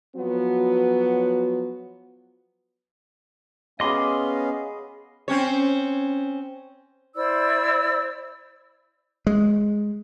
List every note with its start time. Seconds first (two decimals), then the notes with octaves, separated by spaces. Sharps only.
0.16 F3 F#3 B3 F#4
3.80 B3 C#4 G#4 D#5 F5 B5 C6 D6
5.28 C4 C#4 C#5
7.16 E4 C5 D5 E6
9.27 G#3